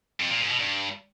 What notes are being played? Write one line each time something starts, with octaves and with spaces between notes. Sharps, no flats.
F2
A#2
G#2
B2
G2